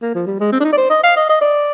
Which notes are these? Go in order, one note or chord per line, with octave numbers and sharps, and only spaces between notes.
A#3
F3
G3
G#3
C4
D4
D#4
D5
C5
D#5
F5
D#5
D#5
D5